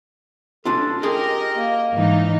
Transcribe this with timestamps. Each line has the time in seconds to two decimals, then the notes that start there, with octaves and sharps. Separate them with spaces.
0.65 C#4 D4 F4 A4
1.03 G4 G#4 A#4 D#5 G5 C6
1.56 A#3
1.93 G#2 E3 D#4